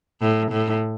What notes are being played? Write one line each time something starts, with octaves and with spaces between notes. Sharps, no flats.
A2
A2